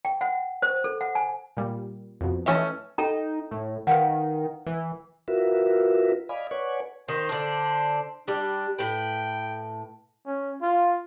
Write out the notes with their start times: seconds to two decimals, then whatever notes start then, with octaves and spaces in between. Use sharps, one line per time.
0.05 G5
0.21 F#5
0.62 C5
0.84 A4
1.01 F#5
1.15 G#5
1.57 A#2 G3
2.21 F2 B2
2.46 E3 A3 C#4 D#5 E5 A5
2.98 D#4 A4 G5 A#5
3.51 A2
3.87 D#3 B4 F5 F#5
4.66 E3
5.28 F4 F#4 A#4 B4 E5
6.29 D5 D#5 F5 G#5 B5
6.51 B4 C#5 D5 F#5 G#5 C#6
7.08 D#3 C5
7.29 D3 D4
8.28 G3 D4
8.79 A2 B4 G5
10.26 C#4
10.62 F4